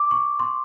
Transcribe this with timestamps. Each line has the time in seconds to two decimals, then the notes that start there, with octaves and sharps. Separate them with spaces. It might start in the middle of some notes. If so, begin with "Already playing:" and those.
Already playing: D6
0.11 C#6
0.39 C6